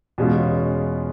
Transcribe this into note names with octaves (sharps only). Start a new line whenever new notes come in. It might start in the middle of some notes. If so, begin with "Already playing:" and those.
E2 B2 G#3 C#4 F4